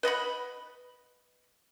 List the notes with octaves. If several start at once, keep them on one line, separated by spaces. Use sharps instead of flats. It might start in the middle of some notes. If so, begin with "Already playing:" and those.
B4 D#5 F#5 B5